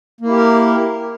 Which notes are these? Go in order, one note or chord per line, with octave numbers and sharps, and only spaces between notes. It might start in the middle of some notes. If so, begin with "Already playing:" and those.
A#3 E4 G4 A#4